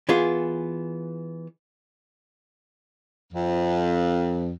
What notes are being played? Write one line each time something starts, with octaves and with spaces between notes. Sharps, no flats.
E3 B3 F4 G#4
F2